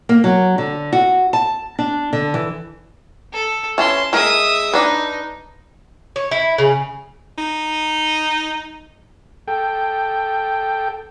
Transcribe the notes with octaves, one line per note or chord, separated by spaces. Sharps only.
A#3
F#3
D3
F#4
A5
D4
D3
E3
A4
E3 C#4 A5 C6
G#3 A#4 E5 D#6
D4 D#4 B4
C#5
E4
C#3
D#4
A4 G5